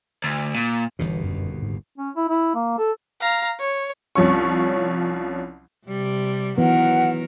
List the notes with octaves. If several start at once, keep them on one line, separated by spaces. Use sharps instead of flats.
D2
A#2
G1 D#2 B2 E3
F#2
G#2
C#4
E4
E4
A#3
A4
F5 A#5
C#5
C2 F3 C#4 C#6
C3 G3
D#3 E3 F#3 B3 A#4 F#5